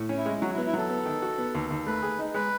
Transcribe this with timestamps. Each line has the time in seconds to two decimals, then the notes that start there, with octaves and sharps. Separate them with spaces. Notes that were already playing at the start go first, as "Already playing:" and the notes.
Already playing: A2
0.09 C#4
0.17 E4
0.26 G#3
0.42 F#3 F#4
0.53 E4
0.57 B3
0.66 E4
0.73 F#3 A4
0.90 B3
1.06 D#3
1.22 F#4
1.38 B3
1.55 D#2
1.70 D#2
1.87 A3 B4
2.02 G#4
2.19 D#4
2.34 G#3 B4